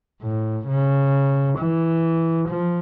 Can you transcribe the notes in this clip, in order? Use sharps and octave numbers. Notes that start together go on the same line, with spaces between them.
A2
C#3
E3
F3